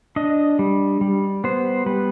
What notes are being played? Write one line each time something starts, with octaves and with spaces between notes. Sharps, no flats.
D4 D#5
G3
G3
B3 C5
G3 B4